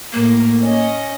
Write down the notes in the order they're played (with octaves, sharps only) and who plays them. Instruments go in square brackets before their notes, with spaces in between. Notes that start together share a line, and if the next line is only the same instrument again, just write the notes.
[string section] A2 A#4 [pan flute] A#3
[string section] C#4 D#5